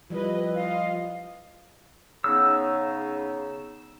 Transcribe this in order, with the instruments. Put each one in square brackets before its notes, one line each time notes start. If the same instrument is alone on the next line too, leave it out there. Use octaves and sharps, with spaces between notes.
[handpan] F3 G3 [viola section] E4 B4 D#5
[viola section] F4 D#5 [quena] F5
[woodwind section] C#3 B3 D#4 [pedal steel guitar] E6